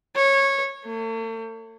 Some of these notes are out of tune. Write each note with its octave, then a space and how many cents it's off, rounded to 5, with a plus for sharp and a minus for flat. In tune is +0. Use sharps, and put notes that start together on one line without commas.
C#5 -15
A3 +45